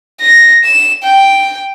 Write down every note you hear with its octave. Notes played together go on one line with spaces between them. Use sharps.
A#6
E7
G5